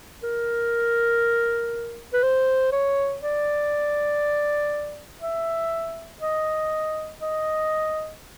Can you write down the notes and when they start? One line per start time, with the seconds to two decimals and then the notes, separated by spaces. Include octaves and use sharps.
0.23 A#4
2.13 B4
2.23 C5
2.72 C#5
3.22 D5
5.22 E5
6.21 D#5
7.21 D#5